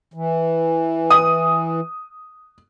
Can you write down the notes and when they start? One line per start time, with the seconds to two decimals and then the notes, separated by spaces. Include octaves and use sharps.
0.14 E3
1.10 D#6